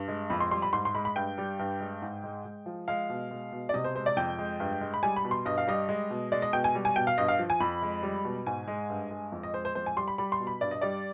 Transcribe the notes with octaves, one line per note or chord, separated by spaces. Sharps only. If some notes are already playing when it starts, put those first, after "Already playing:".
Already playing: G2
G#3
F2 B5
C6
G3 C6
B5
G#2 C6
C6
G#3 B5
B5
G2 G5
G3
G2
G#3
G#2
G#3
G#3
F3
G#3 F5
B2
G#3
B2
D5
C3 D#5
C5
G#3 C5
D5
F2 G5
G#3
G2
G#3
B5
G3 G#5
B5
B2
C6
G2 D#5
F5
G3 D#5
G#3
B2
G#3 D5
D#5
B2 G5
G#5
G3
G#5
B2 G5
F5
G2 D#5
F5
F3
G#5
F2 B5
G#3
G3
B2
G#2 G#5
G#3
G2
G#3
F2
D#5
G#3 C5
C5
F2 C5
G#5
G3 C6
B5
G3 B5
C6
B2
B5
G2 D5
D#5
G3 D5